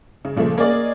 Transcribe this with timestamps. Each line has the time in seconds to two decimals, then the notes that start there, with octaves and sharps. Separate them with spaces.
0.25 C#3
0.36 A#2 C#3 F3 A3
0.58 A#3 C#4 G#4 D5 D#5